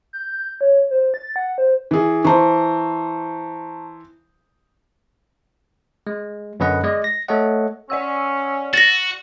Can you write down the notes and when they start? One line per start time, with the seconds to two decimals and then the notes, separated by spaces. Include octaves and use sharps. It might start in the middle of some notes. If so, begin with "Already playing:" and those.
0.13 G6
0.61 C#5
0.91 C5
1.14 A6
1.36 F#5
1.58 C5
1.91 E3 G#4
2.24 E3 C5 A5 A#5 C#6
6.07 G#3
6.60 F#2 D3 B3 B4 D#5 F#5
6.84 G#3 D5 D#5
7.04 A#6
7.28 A3 A4 C#5 D#5 F#5
7.90 C#4 D5 F#5 E6
8.74 F#4 A6 A#6